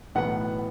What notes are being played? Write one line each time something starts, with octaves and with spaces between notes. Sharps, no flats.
B1 A2 E3 B3 F#5